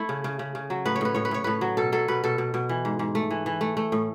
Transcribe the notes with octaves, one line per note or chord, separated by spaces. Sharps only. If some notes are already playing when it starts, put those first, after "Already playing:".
Already playing: A3 E4
C#3
C#3
C#3
C#3
F#3
A2 B4
C#5
A2 B4
A2 C#5
B4
A2 C#5
A2 B4
F#3
B2 A4
F#3 A4
B2 B4
B2 A4
B2
B2
E3
G#2
G#2
A3
E3
E3
A3
A3
A2